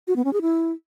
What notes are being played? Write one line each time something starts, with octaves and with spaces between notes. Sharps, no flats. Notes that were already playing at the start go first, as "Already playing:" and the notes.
F#4
B3
C#4
G#4
E4